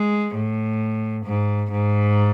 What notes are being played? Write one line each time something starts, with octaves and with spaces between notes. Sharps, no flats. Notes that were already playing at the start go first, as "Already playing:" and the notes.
Already playing: G#3
A2
G#2
G#2